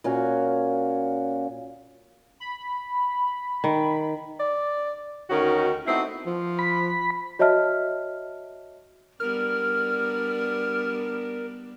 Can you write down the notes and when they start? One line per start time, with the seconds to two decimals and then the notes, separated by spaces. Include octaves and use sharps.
0.04 A#2 C#4 F#4 F5
2.40 B5
3.64 D#3
4.40 D5
5.30 D2 D#3 C#4 D#4 F#4 A#4
5.86 A3 B3 C4 D#4 E4 F#4
6.26 F3
6.59 B5
7.39 F#4 C#5 D#5 E5 A5 F6
9.20 G3 B3 D4 A#4 F6